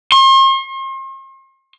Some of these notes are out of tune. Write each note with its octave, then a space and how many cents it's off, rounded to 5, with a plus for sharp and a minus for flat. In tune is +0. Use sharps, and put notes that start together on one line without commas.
C6 +45